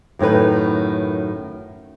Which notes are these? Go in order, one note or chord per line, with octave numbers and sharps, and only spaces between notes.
F#2 A2 D#3 B4